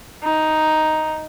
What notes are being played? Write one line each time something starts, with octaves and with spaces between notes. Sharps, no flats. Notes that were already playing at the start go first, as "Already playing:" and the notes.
D#4